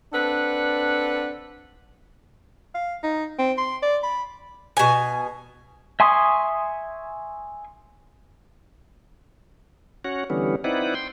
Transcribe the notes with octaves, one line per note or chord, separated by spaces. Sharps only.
C4 D4 A4 B4 F#5
F5
D#4
C4
C6
D5
B5
B2 G#5
E5 G#5 C6 C#6 D#6
C#4 F#4 C#5 F#5
D3 E3 G3 B3 C#4
C4 D#4 E4 B4 D5 F#5
G5 C6